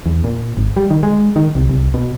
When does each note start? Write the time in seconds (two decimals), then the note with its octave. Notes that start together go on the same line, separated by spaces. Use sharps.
0.06 E2
0.24 A#2
0.57 G#1
0.76 G3
0.90 D#3
1.03 G#3
1.36 D#3
1.55 C2
1.69 C2
1.94 B2